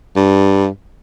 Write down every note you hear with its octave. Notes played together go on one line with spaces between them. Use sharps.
G2